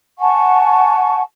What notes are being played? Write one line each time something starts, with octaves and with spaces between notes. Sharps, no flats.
F#5 G#5 A5 C#6